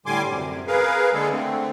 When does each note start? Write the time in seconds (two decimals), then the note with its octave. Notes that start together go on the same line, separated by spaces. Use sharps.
0.06 A2 D3 G3 G#5 C6 D6
0.30 F#2 C3
0.67 G#4 A#4 B4 F5
1.14 D3 G3 G#3 A#3 G#4 A4
1.31 D3 A3 C4